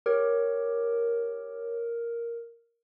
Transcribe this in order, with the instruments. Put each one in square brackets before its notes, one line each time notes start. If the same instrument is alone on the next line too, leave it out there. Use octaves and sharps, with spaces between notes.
[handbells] G4 C#5 [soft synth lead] A#4